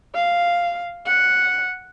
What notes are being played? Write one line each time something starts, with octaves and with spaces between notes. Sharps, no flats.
F5
F#5